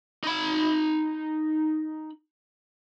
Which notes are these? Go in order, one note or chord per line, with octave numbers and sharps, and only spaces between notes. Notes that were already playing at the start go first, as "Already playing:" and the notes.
D#4 B5